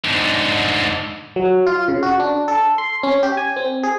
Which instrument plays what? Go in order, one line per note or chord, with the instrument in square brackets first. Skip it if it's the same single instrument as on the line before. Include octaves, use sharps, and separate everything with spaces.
[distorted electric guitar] G#2 D3
[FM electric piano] F#3
F4
C#3
F#4
D4
A4
C6
C#4
G4
G#5
C4
G#4